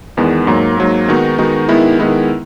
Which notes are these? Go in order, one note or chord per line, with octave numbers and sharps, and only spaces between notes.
E2 D#3 G#3 B3
G#2 F#3 A#3
G#2 F#3 A#3
D#3 G#3 B3 D#4 F#4
D#3 G#3 B3 D#4 F#4
D#3 G#3 B3 E4
D#3 G#3 B3 E4